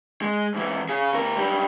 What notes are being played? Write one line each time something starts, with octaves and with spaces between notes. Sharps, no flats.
G#3
G#2 E3
C#3 G#4
D2 A#4
F#2 G3